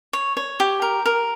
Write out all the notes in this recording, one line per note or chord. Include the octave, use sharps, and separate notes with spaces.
C#5
C#5
G4
A#4
A#4